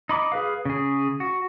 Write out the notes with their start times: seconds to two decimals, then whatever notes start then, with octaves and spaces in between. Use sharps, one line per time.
0.09 D#4 B5 D6
0.32 G#4 B4 F5
0.65 C#3 G#4
1.20 F#4